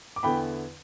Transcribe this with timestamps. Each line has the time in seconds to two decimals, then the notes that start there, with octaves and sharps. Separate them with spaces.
0.16 D6
0.23 E2 D3 B3 E4 G5 B5